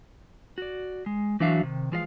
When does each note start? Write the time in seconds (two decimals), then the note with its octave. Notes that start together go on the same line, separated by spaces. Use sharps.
0.58 F#4 D5
1.06 G#3
1.40 E3 F#3 D4 F#4 E5 F5
1.63 C3 D#3
1.92 E3 F3 G#3 D#5 F5